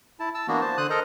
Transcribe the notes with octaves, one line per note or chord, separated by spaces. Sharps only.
E4 A5
A5 E6
E3 A#3 B3 D4 F#4
C5 A5
D3 C5 D#6 F#6
A4 A#4 C5 D#5 A#5